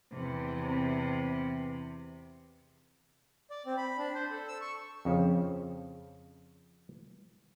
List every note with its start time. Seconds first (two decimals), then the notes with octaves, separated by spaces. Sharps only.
0.12 E2 C3
3.50 D5
3.66 C4
3.77 B5
3.98 D4
4.15 C5
4.31 A4
4.48 E6
4.61 C#6
5.05 F2 C#3 F3